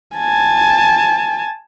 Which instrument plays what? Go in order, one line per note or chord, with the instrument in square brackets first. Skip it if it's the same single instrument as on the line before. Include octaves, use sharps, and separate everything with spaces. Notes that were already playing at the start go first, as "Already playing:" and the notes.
[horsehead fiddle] G#5 A5